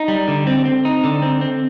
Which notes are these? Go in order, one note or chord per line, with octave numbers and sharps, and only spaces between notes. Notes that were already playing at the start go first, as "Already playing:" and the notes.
Already playing: D#4
G3
D3
C4
C4
D#4
D3
C4
C4